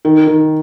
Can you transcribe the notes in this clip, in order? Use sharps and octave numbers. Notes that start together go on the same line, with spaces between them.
D#3
D#3